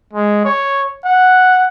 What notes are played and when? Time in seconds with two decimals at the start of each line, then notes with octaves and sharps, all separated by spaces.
0.13 G#3
0.45 C#5
1.05 F#5